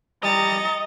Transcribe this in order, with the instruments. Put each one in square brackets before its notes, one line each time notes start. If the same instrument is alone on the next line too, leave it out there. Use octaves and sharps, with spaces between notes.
[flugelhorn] G3 [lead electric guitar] D#5 [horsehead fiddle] A#5 [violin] A6 C#7